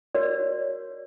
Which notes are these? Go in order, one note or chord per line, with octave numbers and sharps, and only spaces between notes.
F#4 A#4 C#5 D5